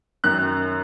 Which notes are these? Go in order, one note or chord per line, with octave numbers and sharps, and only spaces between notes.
F#2 D#3 F#6